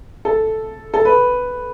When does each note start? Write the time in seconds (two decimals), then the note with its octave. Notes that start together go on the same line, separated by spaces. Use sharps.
0.25 A4
0.94 A4
1.05 B4